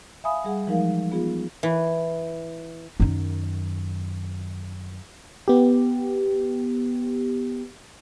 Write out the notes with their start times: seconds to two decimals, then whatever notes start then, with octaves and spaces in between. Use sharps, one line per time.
0.24 E5 F5 G#5 B5 D#6
0.44 G3 G#4 F#5
0.67 E3 F3 G#3 D#4 A#4 F5
1.12 B3 F4 G#4
1.63 E3
3.00 F#2 D#3
5.48 B3 G4